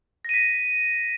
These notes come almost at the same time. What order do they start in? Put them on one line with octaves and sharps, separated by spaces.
A#6 D#7 B6